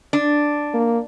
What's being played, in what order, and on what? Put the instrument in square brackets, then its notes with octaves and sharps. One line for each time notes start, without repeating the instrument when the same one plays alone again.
[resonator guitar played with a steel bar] D4
[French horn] A#3